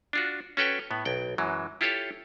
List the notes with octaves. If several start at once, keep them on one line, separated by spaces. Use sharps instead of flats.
D4 F4 F#4
C#4 F#4 A4 B4 C#5 G5
A2 B3
B1 G5
F#2 E3 F#3 G#3
E4 F4 G4 A4 C#5 F5